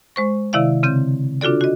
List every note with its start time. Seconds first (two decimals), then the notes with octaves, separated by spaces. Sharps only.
0.16 G#3 C5 C#6
0.53 C3 D#3 E4 D5 E5 F5
0.83 C#3 C4 G6
1.41 D4 F4 F#4 A4 D5
1.61 F#4 D#5